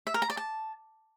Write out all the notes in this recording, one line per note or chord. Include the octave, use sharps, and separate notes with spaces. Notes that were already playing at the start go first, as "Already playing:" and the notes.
E5
A#4
A#5
D5
A5